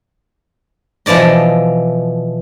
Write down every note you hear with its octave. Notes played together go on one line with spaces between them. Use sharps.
B2 E3 F3 D5 D#5